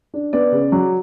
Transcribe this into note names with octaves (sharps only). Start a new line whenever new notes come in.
D4
B3 D5
C#3
F#3